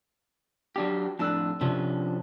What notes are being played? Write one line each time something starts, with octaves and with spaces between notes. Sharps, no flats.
F#3 D4 G4
F2 A2 D4 A5 E6 F#6
C3 F3 C#4 D4